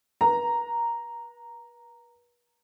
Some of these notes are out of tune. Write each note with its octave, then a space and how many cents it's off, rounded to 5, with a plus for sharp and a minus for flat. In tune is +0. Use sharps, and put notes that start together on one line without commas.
B4 -40 A#5 -5